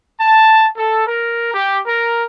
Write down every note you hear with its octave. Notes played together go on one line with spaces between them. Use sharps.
A5
A4
A#4
G4
A#4